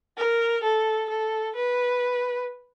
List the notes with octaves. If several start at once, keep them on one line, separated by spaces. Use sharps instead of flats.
A#4
A4
A4
B4